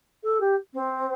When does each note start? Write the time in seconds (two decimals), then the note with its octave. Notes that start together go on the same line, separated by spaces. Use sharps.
0.23 A4
0.40 G4
0.73 C4